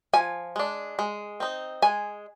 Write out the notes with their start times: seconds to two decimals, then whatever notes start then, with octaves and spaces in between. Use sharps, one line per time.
0.13 F3 G#5
0.56 G#3 D4
0.99 G#3
1.40 C4 D#4
1.82 G#3 G#5